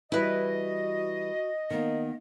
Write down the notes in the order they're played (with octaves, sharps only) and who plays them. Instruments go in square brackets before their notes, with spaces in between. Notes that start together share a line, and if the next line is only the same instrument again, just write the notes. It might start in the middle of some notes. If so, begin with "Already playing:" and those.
[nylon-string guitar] E3 G3 [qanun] E4 B4 [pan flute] F#4 [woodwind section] D#5
[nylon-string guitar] D#3 A#3 [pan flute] B3